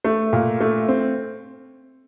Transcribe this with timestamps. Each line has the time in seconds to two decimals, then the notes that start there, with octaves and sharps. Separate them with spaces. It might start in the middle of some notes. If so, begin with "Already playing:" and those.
0.05 A3
0.33 A#2
0.61 A3
0.88 C4